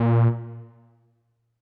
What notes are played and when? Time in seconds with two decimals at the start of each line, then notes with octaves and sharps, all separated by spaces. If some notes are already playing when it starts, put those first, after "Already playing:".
Already playing: A#2